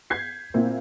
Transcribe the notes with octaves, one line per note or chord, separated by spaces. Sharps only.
G6 G#6 B6 C7
A#2 A#3 C4 E4